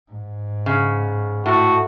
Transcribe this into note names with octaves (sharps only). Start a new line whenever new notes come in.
G#2
C#3
A2 F#4